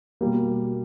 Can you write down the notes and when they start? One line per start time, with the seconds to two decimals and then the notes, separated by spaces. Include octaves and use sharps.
0.21 B2 G3 A#3